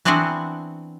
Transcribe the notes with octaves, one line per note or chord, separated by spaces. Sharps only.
E3 B3 C4 D4 F#4 C5